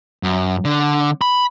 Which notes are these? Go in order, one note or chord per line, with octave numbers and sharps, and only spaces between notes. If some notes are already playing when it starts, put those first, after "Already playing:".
F#2
D3
B5